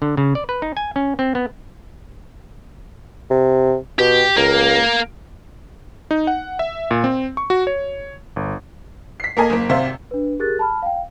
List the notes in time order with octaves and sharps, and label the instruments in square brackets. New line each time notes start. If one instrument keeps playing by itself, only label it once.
[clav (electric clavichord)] D3
C#3
D5
B4
D#4
G#5
C#4
C4
B3
[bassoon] C3
[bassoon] B2 [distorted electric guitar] G4
[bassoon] C#2 [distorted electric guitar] A#3
[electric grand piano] D#4
F#5
E5
A#2
C4
C#6
F#4
C#5
G1
[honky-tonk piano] B6 C7
A#3 A4 A#4 D#5 G#5
F#1 A#3
G#1 C3 C5 E5 F5
[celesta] D4 B4
G4 G#4 A#4 F#6 A6
A5 B5 F6
F5 G5